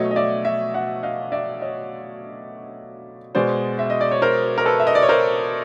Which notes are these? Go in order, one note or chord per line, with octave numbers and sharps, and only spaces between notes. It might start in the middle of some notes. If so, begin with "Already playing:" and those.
Already playing: B2 F#3 A3 C#5 D#5
D#5
D5 E5
D5 E5
E5 F#5
D#5 F5
D5 E5
C#5 D#5
B2 G#3 C5 D5
E5
D#5
D5
C#5
A#4 C5
A#4
A4 B4
E5
D#5
D5
C#5
A#4 C5